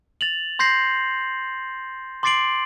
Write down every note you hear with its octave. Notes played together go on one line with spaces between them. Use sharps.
A6 F7 F#7
C6 G6 A#6 C7 F#7
C6 D6 A6 C7 D7 F#7